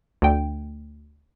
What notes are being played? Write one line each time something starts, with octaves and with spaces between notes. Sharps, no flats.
D2 G5